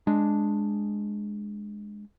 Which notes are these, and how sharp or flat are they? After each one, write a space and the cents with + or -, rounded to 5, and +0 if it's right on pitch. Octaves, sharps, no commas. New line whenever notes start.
G#3 +0 D4 +0